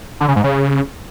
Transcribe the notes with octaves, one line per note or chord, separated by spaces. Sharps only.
D3
C#3
G#2
C#3